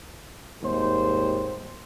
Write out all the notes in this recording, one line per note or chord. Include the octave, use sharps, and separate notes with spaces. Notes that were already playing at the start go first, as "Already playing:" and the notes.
G#1 D#2 G3 C5